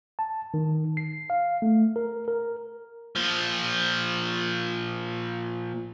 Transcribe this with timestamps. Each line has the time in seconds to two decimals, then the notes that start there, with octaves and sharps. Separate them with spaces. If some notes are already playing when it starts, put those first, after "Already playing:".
0.19 A5
0.54 D#3
0.97 C7
1.30 F5
1.62 A3
1.96 A#4
2.28 A#4
3.16 A#2 F3